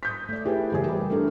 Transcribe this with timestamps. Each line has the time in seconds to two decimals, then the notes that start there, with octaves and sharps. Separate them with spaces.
0.03 D#6 G6 B6
0.29 A3 D5
0.45 E4 G4 G#4 B4
0.72 F#1 E3 G4 G#4 A#4
0.88 G3
1.10 A3 D4 A4 A#4